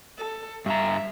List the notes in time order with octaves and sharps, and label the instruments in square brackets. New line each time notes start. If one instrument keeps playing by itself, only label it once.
[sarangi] A4
[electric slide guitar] G2 A#5 [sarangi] E5